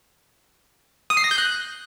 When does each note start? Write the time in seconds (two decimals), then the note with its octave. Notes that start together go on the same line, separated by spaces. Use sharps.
1.10 D#6
1.17 C7
1.24 A#6
1.31 G6
1.38 F#6